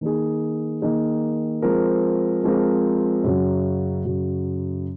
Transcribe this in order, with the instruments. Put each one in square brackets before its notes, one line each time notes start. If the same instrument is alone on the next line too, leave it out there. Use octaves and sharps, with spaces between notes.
[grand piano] D#3 A#3 D#4 G#4
D#3 A#3 D#4 G#4
F3 G#3 C4 F4 A#4
F3 G#3 C4 F4 A#4
F#2 C#3 F#3
F#2 C#3 F#3